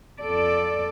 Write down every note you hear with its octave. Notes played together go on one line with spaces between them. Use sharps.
F2 A4 D5